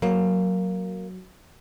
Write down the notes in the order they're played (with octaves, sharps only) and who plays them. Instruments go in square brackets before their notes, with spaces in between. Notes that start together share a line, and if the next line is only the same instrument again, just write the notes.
[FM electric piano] F#3 [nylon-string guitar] A#3